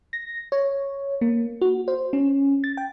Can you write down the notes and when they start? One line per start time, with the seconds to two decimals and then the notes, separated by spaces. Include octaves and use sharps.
0.13 A#6
0.52 C#5
1.21 A#3
1.61 F#4
1.88 C5
2.13 C#4
2.64 A6
2.77 G5